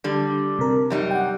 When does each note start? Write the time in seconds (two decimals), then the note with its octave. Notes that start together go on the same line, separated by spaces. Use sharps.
0.04 D3 G3
0.59 C3 A#4
0.90 F#2 G3 D#4
1.11 F#5 G5